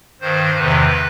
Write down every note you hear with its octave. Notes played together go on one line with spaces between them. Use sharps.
G2 D#3 C5
E2 C3 D#3 B4